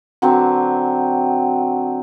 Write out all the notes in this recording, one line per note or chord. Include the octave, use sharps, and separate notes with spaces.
D3 F#3 C4